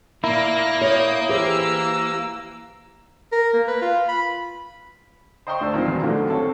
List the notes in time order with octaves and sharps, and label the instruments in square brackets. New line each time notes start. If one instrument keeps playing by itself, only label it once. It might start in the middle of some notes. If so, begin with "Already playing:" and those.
[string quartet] A#2 D5 A#6 [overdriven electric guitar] A#3 [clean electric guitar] E4
[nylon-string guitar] C#5 [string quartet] G5 D#6
[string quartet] E3 E6 [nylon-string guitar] G4 G#4 C5
[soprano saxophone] A#4
A#3
B4
F4
B5
[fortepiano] C5 D#5 G5 A#5 C6 C#6
D2 D4 C5 A5 E6
A#2 D#3 F3 C4
E2 B2 F#3
F#2 A2 D3 D#3 F3
C4 A4 C#5